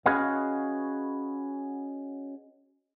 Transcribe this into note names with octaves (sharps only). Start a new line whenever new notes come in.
C#4 F#4 G#4 B4 D#5 F5